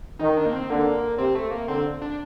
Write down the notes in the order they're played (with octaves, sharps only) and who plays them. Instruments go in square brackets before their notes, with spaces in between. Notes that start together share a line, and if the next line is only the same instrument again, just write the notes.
[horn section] D#3 [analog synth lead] D#4
[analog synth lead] D4
A#3
C4
[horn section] D3 [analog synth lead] A#3
[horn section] C3 [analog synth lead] C4
[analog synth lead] A3
A#3
[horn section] D3 [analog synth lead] C4
[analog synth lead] D4